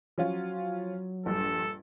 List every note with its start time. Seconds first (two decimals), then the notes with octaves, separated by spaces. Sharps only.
0.18 F3 F#3 C#4 F4
1.26 A#1 G2 A4